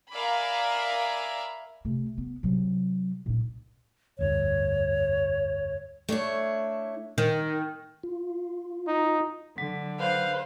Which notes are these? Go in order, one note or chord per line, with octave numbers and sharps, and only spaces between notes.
A#4 D5 E5 F5 G#5 B5
C3 A3
B3
C3 F#3
A#2 D#4
F1 D2 G2 C#5
A3 D4 E4 C#5
D#3
F4
D#4
D3 F#3
B4 C5 F5